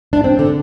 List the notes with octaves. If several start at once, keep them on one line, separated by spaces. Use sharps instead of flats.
D4
C4
D3